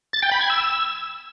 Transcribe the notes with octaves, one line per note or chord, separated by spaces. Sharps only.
A6
G5
B5
G#6
E6